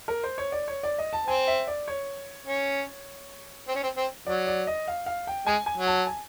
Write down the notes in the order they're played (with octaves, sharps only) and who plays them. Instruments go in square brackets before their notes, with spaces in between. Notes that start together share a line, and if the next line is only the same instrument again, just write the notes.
[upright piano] A#4
C5
C#5
D5
C#5
D5
D#5
A5
[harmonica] C4 [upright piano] G#5
[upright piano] E5
D5
C#5
[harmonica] C#4
C4
C#4
C4
C4
[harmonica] F#3 [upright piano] D5
[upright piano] D5
D#5
F5
F5
G5
[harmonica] G#3 [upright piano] G#5
[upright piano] G#5
[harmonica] F#3
[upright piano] A5
G#5